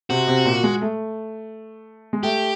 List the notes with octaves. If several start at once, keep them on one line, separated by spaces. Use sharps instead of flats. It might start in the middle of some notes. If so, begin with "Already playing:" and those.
C3 C4 F#4
C3 C4
A#2 A#3
G#3
A3
G#3
A3 G4